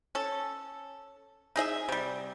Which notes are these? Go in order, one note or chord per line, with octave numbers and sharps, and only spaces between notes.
C#4 A4
D#4 G#4 D#5 E5
C3 G3